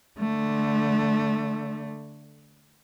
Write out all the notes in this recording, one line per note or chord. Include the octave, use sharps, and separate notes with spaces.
D3 A3